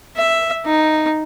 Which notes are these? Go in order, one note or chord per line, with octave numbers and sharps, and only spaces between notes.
E5
D#4